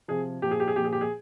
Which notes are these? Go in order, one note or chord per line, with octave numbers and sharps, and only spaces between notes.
C3 F3 G#4
A#2 F3 G4
G#4
G4
G#4
A#2 F3 G4
G#4
G4
G#4